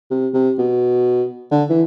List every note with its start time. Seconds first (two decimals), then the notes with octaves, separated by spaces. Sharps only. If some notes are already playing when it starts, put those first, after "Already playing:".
0.10 C3
0.33 C3
0.58 B2
1.51 D3
1.69 E3